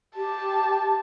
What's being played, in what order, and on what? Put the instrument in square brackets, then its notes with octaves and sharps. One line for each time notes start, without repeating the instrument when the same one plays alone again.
[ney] G4 [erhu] A5